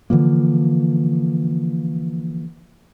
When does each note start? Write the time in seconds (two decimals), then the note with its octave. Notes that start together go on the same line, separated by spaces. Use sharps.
0.10 D3 E3 F3 A#3